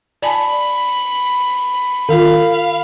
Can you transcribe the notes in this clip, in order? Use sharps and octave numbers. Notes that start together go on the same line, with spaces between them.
D5 G#5 A5 B5
D#3 F4 F5